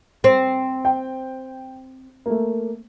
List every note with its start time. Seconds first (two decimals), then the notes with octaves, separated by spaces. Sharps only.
0.24 C4
0.85 G5
2.26 A3 A#3